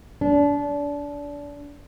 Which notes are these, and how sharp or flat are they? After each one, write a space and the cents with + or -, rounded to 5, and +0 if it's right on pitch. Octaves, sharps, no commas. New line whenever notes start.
D4 -25